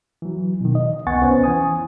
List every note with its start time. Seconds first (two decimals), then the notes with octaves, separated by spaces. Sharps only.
0.22 E3 F#3
0.61 B2 D#3
0.75 D#5
1.07 C2 B3 F#5 G#5 C#6 A6
1.22 B3 C#4 C5
1.44 E3 G#5 D#6